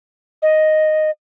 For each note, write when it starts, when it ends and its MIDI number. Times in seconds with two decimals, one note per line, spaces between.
0.42 1.10 75